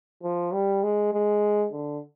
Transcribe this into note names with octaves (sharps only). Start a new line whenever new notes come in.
F3
G3
G#3
G#3
D3